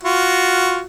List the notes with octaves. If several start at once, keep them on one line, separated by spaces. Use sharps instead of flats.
F4 F#4